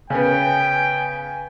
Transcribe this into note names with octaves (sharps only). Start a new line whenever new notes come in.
C#3 B3 G5 G#5